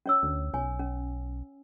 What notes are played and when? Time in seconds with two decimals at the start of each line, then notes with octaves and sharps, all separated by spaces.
0.06 C#4 C#5 E6
0.23 D2
0.54 B1 C#5 G#5
0.79 C#4